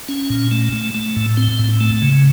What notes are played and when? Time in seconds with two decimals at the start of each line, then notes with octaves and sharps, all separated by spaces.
0.09 C#4
0.30 A#2
0.51 A3
0.72 A3
0.94 A3
1.16 A2
1.37 C4
1.59 A2
1.81 A3
2.02 C#3